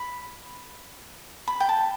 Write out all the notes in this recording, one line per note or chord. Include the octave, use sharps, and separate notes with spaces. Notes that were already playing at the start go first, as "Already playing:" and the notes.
Already playing: B5
B5
G5
A5